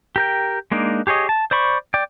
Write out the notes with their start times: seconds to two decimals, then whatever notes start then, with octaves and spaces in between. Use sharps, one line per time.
0.16 G4 A#4 G5
0.72 G#3 A#3 D4 D#4
1.07 G4 G#4 C#5 D#5
1.29 A5
1.51 C5 D5 B5 C#6
1.94 D5 G5